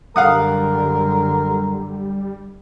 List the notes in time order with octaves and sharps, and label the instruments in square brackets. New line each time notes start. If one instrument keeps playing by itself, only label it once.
[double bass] F#2 D3 [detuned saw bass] G3 [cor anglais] A#4 [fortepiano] F5 F#5 D#6